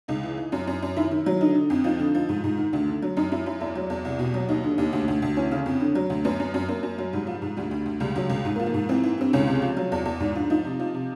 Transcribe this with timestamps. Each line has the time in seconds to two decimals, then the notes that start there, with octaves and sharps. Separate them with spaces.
0.08 C#2 D#4
0.23 E3
0.37 E3
0.52 F#2
0.67 F#2
0.82 F#2
0.96 D#3 E4
1.11 D#3
1.26 F#3
1.41 D3 D#4
1.55 D3
1.70 F2
1.84 F3 D#4
1.99 D3
2.15 F3
2.29 G#2
2.44 G#2
2.58 D#3
2.72 D2 D4
2.88 D3
3.02 F#3
3.17 F#2 D#4
3.32 F#2 E4
3.46 F#2 E4
3.60 E2 E4
3.75 F#3
3.90 E2
4.05 C2
4.19 B2
4.34 F#3
4.49 D#2 D#4
4.63 D3
4.78 D#2
4.93 D2
5.08 D2
5.22 D2
5.36 E3 C#4
5.51 C#3
5.66 F2
5.80 D3
5.95 F#3
6.10 D2
6.24 F#2 B3
6.40 F#2
6.54 F#2
6.68 F#2 A#3
6.83 F#2
6.98 F#3
7.13 G#2 G3
7.27 F3
7.42 G#2
7.57 D2 G3
7.71 D2
7.86 D2
8.00 C#2 G3
8.15 C#2 F#3
8.30 C#2
8.45 G#2
8.56 A#3
8.60 F3
8.66 A#3
8.74 G#2
8.89 E3 C4
9.03 E3
9.18 G2 C4
9.33 C#2 C#4
9.47 C3
9.62 F3
9.77 F#3
9.92 E2
10.05 E2
10.20 G#2
10.35 F3 D4
10.50 F3 D#4
10.65 C3
10.80 F3
10.94 C3